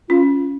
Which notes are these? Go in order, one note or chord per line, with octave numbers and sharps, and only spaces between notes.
C#4 F4